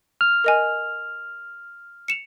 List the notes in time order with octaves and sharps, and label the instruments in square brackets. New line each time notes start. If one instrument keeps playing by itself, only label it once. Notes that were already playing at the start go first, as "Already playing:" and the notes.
[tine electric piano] F6
[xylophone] A#4 D#5 G#5
C#7 E7 F7